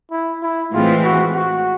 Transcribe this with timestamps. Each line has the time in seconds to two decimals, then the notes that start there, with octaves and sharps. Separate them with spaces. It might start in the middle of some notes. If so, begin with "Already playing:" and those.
0.12 E4
0.43 E4
0.73 A2 E3 G#3 C4 F4
1.04 F#4
1.35 F#4